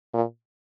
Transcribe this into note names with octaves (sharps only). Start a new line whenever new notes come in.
A#2